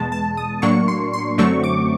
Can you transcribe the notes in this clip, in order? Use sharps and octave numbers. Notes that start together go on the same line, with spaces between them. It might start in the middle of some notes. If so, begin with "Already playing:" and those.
Already playing: E2 B2 G#3 A5
A5
D#6
A2 F#3 A#3 D4 C#6
C6
C6
F#2 D3 F#3 A3 C4 C#6
D6